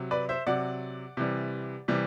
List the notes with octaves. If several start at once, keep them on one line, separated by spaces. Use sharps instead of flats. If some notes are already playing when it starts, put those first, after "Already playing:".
Already playing: C3 F#3
B4 D5
C5 E5
C3 F#3 D5 F#5
C3 E3 G3
C3 E3 G3